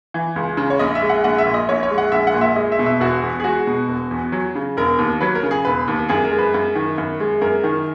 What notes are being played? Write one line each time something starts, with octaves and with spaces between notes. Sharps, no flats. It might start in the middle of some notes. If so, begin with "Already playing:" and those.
E3
C#2
C#3
C#5
A#1 D#5
E5
G#3
F#5
A#1 F#5
E5
A#2
D#5
A#1 C#5
C#5
G#3
F#5
A#1 E5
F#5
A#2
E5
G#3 D#5
E5
B2
E5
E1 F#4
E2
G#4
G#3 F#4
B2
E1
E2
F#3
C#3
E1 A#4
D#2
F#3 B4
A#4
C#3
G#4
E1 B4
D#2
F#2 G#4
A#4
G#3
B4
F#2
D#3
F#2
G#3
F#2 A#4
D#3